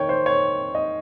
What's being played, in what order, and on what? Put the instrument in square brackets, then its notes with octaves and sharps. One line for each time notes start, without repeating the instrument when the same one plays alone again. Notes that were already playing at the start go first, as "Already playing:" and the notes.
Already playing: [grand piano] D#3 C#5 G5
C5
C#5
D#5